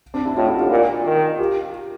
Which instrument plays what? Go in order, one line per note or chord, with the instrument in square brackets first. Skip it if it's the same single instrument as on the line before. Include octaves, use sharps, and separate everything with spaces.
[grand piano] C4 D4
D4 E4
[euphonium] A2 [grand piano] D#4 F4
[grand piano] E4 F#4
F4 G4
[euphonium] A#2
D#3
[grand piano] F4 G4